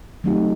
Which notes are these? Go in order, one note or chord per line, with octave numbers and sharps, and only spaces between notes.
F#3 A3 C4 D#4 G4